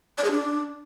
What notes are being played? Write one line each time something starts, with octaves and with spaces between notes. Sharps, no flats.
D5
G#4
D4